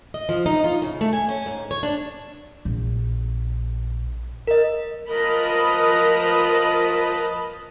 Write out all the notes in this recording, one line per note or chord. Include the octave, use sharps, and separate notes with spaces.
D#5
F3
D#4
F4
C#3
A3
G#5
C#4
G#2
C#5
D4
A#1
A#4 D#5
F3 A#4 B4 D#5 A5 B5